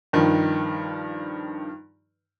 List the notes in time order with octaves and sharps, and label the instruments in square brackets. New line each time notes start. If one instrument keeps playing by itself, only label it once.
[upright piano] G2 D#3 F3